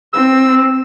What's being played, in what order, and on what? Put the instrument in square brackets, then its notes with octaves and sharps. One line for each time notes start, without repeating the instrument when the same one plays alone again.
[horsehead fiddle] C4 [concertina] E6